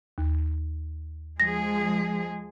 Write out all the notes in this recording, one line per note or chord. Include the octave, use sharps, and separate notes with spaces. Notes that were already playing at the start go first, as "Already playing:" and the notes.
D#2
F3 G#3 G#4 A#6